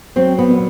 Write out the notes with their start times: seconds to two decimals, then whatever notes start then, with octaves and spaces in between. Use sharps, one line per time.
0.16 F#3 C4
0.39 B3
0.49 A#2